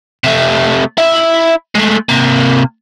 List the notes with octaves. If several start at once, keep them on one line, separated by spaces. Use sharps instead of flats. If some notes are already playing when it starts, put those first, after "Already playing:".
C3 A3
E4 E5
G#3 A3
C3 A#3